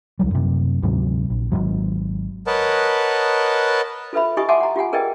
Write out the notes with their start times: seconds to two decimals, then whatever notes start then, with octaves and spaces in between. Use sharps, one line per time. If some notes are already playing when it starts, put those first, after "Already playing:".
0.19 C#2 F#3 G3
0.31 F#2 C3
0.83 D2 G#2 C3 F#3
1.30 A#1
1.52 G#1 F2 G#2 F#3
2.47 A#4 B4 C#5 D#5 F#5 A5
4.13 F4 A4 B4 E5 B5
4.37 E4 G4 D#5 G#5 C#6 D#6
4.49 E5 F#5 G#5 A5 C6 D6
4.60 F#5 A#5
4.76 F4 G4 F#5 G#5
4.93 G#4 A#4 B4 D5 D#5 G5